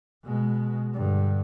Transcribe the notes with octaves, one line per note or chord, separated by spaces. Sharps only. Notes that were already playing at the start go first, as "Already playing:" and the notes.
B2 G#3
G2 D3